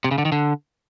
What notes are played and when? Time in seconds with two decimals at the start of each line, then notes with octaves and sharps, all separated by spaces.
0.04 C3
0.11 C#3
0.18 D3
0.25 D#3
0.32 D3